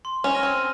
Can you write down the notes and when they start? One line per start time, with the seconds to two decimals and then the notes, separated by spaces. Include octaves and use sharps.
0.05 C6
0.24 C#4
0.33 F6 A#6 D#7 G7
0.43 C4